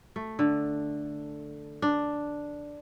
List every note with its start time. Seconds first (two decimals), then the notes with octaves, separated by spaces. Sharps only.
0.16 A3
0.39 D3
1.82 D4